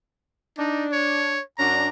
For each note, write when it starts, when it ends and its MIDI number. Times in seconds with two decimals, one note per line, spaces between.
0.58 1.36 62
0.58 0.87 63
0.92 1.42 73
1.58 1.88 42
1.58 1.88 61
1.58 1.88 62
1.58 1.89 82